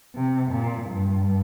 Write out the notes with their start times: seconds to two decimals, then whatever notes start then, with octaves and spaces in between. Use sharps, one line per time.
0.15 C3
0.52 A#2
0.90 G2